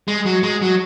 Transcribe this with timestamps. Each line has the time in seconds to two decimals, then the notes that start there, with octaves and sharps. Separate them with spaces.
0.08 G#3
0.26 F#3
0.43 G#3
0.62 F#3